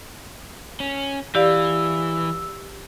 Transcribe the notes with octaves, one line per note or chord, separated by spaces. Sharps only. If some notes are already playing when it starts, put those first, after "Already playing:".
C#4
E3 G4 D5 F5 E6